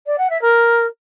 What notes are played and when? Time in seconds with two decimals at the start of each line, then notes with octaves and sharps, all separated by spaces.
0.06 D5
0.18 F#5
0.30 E5
0.42 A#4